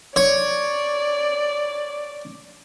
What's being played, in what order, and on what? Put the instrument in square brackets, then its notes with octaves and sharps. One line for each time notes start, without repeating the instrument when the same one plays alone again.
[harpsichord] C#5 [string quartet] D5